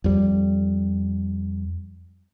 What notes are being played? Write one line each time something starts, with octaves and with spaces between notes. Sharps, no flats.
F2 G3